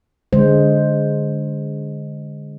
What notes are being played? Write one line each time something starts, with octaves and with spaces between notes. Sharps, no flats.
D3 G#3 C5